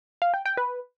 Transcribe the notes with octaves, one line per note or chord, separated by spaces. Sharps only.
F5
G5
G5
B4